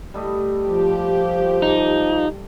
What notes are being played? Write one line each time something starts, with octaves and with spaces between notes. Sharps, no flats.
G3 A3 D#5
F3 G4
D#4